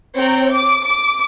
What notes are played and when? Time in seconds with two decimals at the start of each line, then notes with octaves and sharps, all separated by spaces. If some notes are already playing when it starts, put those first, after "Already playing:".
0.16 C4 C#5 G5 A#5
0.50 D6
0.86 D6